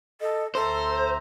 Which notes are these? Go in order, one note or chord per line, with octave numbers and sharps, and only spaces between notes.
A4 D#5
D2 A4 C5 E5 A#5 C6